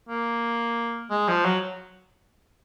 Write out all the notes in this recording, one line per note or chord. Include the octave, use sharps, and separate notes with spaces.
A#3
G#3
F3
F#3